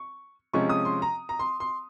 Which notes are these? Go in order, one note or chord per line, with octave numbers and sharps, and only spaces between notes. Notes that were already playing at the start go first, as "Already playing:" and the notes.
Already playing: C#6
C3 F3 G#3 C#4 C#6
D#6
C6
A#5
A#5
C6
C6